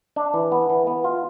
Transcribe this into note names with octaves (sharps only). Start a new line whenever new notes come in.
D4
E3
B3
E3
B3
F4